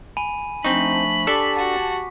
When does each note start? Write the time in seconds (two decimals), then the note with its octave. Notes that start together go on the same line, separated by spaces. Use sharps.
0.17 G#5 B5 D#7
0.64 F3 A3 C4 D4 D#4 B5 C#6
1.27 D4 G4 A4 A5 D6 B6
1.56 F#4